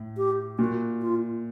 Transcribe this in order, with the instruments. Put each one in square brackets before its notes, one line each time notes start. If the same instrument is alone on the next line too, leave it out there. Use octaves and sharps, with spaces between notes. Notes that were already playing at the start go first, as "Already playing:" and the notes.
Already playing: [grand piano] A2
[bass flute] G4
[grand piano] A#2 [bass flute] F#4
[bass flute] F4